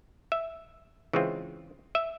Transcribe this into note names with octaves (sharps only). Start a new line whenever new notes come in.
E5
C#3 E3 G#3 C4 F4
E5